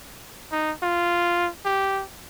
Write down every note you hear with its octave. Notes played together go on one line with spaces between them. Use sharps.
D#4
F4
G4